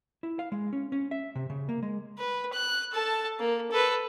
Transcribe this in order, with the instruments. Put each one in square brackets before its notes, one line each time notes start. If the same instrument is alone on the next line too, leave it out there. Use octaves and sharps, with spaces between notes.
[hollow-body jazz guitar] E4
F5
G#3
C#4
C#4
E5
C3
C#3
A#3
G#3
[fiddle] B4
F#6
A4 A5
A#3
A4 B4